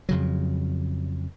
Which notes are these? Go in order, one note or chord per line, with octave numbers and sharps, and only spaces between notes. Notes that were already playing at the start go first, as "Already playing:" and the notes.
F2 C#3 F#3